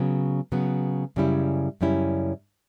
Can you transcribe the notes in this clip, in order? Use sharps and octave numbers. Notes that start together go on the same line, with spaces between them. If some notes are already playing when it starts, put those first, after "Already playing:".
Already playing: C#3 F#3 B3
C#3 F#3 B3
F#2 C#3 G3 C#4 E4
F#2 C#3 G3 C#4 E4